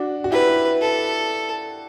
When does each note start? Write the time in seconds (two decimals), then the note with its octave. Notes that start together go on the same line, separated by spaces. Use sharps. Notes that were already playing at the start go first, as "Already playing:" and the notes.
Already playing: D4 F#4
0.24 F#4
0.31 E4 G4 B4
0.81 A4